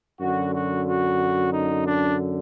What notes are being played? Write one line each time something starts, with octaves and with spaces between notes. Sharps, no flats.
F#2 D3 F#4
F#4
F#4
D#4
D4